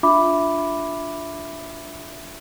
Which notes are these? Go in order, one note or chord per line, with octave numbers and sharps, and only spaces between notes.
D4 F4 E5 B5 D6